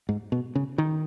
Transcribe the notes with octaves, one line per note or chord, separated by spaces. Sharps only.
G#2
B2
C#3
D#3